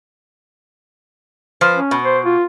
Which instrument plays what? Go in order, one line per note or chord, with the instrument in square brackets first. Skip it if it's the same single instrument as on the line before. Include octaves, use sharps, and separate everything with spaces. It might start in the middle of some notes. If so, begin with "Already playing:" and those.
[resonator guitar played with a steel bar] F3 B4 C5
[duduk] C#4
[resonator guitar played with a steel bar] B2
[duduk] C5
F4